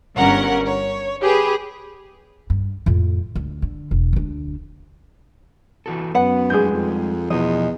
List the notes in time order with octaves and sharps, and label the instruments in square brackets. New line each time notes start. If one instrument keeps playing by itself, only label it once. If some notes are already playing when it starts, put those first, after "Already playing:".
[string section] G1 G2 C#4 A#4 F#5
C#5
G4 G#4 B4
[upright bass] G2
F2 A2
D2
D3
E1
D2 D4
[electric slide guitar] E3 F#4 A4
[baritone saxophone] F#2 [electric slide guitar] B3 [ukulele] B4 F#5
[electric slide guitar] G3 G#3 D#4 [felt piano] G#4 G6
[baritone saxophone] F2
[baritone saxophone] E2 [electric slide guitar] B2 F3 [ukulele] D#5